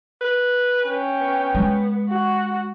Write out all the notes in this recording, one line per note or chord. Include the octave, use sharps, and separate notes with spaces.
B4
C#4 G5
B3
G#3
F#4